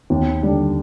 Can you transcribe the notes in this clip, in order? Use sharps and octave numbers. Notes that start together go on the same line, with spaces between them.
D#2
D3 G3 D4